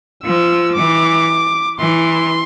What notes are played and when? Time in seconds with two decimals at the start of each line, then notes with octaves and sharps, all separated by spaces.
0.24 F3 E6
0.75 E3 D6
1.79 E3 C6